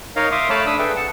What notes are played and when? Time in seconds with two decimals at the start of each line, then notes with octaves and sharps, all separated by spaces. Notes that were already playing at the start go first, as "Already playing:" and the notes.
0.16 D#4 A#4 C#5 D#5 F5
0.32 E5 F5 C6 D6 D#6
0.50 A3 C#5 F5 A5 B5 D6
0.66 D4 B5 D#6 E6
0.79 G#4 A4 B4 E5 G5
0.96 F#5 A5